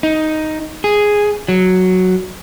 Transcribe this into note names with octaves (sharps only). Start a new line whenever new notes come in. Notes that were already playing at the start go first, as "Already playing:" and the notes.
D#4
G#4
F#3